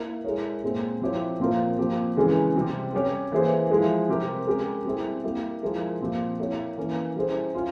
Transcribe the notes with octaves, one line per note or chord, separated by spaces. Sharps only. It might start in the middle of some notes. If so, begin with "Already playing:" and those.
Already playing: A#3 E4 A#4
G#3 E4 A#4 C#5
A#2 G#3 C4
F3 C4 E4 G4 C#5
A#2 F3 C4 F4 A#4
A#2 F3 C4 G4
C#3 E3 G#3 C#4
C3 G3 C4
G3 C#4 G4 C#5
E3 A#3 E4 G#4 C5
F3 G#3 E4
C3 G3 C4 G4 A#4
G#3 C#4 G4 A#4
G3 C4 E4 G#4
G3 A#3 E4 G4
F3 G#3 E4 A#4
A#2 F3 C4 G4
A#3 E4 G4 C#5
E3 A#3 C#4
G3 C#4 E4 G#4 C5
C#4 F4